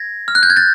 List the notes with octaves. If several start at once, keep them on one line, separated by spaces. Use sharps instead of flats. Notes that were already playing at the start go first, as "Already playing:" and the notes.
Already playing: G#6 A#6
F6
F#6
G6
G#6
G6 A6